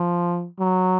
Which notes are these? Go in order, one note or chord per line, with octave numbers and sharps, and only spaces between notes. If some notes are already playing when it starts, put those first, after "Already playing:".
Already playing: F3
F#3